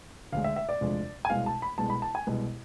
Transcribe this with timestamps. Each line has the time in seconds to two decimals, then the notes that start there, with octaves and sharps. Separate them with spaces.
0.32 D2 D3 G#3 F5
0.44 E5
0.56 E5
0.69 D5
0.81 E1 D2 C3 F3 G#3
1.25 G#5
1.29 C2 B2 G#3 F5
1.46 A5
1.62 B5
1.78 C2 B2 G#3 A5
1.90 B5
2.02 A5
2.15 G#5
2.27 C2 B2 G#3